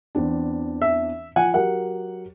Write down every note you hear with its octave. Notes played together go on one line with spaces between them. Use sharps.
E2 C4 D4
E5
F3 F#5 G#5
F#3 G4 A#4 F#5